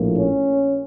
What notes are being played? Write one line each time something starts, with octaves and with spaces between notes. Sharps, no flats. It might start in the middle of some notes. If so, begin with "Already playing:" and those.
Already playing: A#1 A2 F3 A#3
C#4